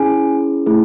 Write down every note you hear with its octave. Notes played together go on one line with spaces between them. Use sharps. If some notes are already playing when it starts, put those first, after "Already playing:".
Already playing: C#4 E4 G#4 G#5
A3 E4 G#4